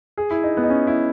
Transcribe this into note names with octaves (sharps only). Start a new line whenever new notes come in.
G#4
E4
D#4
B3
D#4
C#4
E4